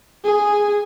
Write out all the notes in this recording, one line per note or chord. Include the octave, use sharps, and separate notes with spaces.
G#4